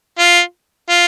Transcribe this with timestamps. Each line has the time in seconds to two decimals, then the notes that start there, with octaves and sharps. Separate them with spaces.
0.19 F4
0.89 F4